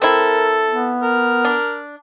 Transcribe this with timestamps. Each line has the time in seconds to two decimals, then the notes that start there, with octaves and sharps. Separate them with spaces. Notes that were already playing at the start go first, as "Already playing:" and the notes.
0.02 C4 E4 A4 A#4
0.71 B3
1.03 A#4
1.45 D4